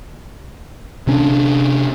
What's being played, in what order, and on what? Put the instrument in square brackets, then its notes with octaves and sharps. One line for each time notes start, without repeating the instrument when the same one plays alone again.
[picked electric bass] C3 C#4 D4